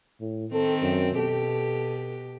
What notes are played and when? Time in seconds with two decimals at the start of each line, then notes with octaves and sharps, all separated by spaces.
0.20 A2
0.53 D#3 C4 A4
0.82 F#2
1.15 B2 G4 A4